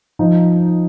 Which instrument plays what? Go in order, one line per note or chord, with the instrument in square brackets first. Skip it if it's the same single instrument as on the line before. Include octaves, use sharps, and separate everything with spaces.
[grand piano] F3 D#4